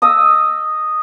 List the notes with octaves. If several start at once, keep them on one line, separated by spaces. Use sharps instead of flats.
D#5 D#6 E6